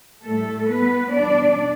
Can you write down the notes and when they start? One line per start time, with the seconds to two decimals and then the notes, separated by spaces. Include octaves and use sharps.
0.24 A2 G3 A3 A4
0.68 B3 B4
1.12 E2 B2 G3 D4 D5